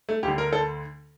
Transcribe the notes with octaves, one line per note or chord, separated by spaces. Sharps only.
A3
D2 D3 G4
A#4
A4